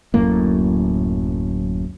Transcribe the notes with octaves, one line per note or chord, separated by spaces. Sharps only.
D1 F#2 A2 A#3